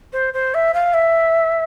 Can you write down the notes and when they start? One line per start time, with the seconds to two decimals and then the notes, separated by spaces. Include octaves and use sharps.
0.12 C5
0.33 C5
0.54 E5
0.73 F5
0.93 E5